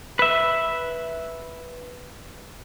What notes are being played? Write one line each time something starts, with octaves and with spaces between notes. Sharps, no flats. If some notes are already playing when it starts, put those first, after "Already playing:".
B4 E5